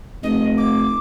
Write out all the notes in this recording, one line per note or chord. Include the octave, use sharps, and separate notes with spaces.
F1 D#5
D6